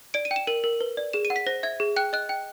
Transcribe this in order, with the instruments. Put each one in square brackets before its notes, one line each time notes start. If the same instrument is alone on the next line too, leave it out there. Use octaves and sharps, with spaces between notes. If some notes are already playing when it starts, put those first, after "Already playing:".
[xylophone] D5 D7
D#7
G5
E7
A#4 D#7
A#4
B4
D5
G#4 E7
D#7
F#5
B6
C5 A#6
E5 G#6
G#4
G5 F#6
D#5 F#6
G5